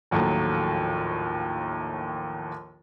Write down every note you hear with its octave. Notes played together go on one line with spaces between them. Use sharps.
A#1 D#2 A2 F3 F#3 A3